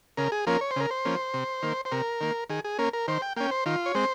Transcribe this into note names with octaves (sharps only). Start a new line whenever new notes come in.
C#3 A#4
G#4
F3 A#3 C#4 A#4
C#5
C5
C#3 A#4
C5
F3 A#3 C#4
C3
D#3 A#3
C5
C3 A#4
D#3 A#3
D#3 G#4
G#4
A#3 C#4 A#4
A#4
D#3 C5
G5
A#3 C#4 G5
C5
D#3 F4
C#5
G#3 C4 C5